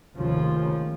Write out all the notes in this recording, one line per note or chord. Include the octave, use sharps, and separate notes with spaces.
F1 D#2 C#3 F3